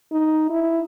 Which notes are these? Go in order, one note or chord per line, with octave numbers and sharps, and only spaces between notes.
D#4
E4